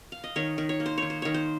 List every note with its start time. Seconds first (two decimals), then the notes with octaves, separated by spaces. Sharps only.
0.12 F5
0.24 D#5
0.36 D#3 C#5
0.58 D#3
0.69 C#5
0.80 A#3
0.86 C5
0.98 D#3 C#5
1.10 C5
1.22 D#3 C#5
1.34 C5